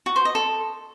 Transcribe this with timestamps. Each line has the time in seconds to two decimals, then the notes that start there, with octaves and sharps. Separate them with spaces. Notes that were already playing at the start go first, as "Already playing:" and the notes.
0.06 F#4
0.16 C5
0.25 D#5
0.35 A4